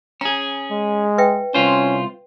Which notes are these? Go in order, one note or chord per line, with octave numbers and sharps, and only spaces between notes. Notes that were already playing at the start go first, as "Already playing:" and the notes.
C#4 G#4 A#5
G#3
B4 E5 G5
C2 C#4 F4 C5